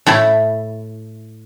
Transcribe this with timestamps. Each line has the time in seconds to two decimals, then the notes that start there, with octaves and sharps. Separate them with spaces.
0.06 A2 A3 E4